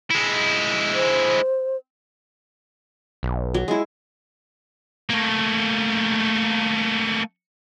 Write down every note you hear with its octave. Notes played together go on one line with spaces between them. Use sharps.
G#3 E4
C5
B1
F#3
G#3 E4
A3 A#3